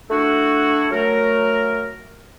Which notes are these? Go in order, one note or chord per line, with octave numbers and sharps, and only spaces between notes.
A3 D4 E4 F#4
F#3 A3 A#4